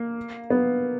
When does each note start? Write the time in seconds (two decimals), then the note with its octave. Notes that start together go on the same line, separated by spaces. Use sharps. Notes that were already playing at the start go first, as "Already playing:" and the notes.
Already playing: A#3
0.50 B3